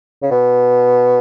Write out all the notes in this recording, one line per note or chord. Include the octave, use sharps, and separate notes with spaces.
C#3
B2